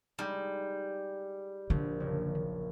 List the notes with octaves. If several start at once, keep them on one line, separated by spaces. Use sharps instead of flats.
G3 G#3 D#4
A#1 D3
F#1